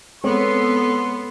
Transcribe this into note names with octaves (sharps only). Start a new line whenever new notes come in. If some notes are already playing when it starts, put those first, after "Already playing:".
G#3 B3 C4 A4 C#5 C6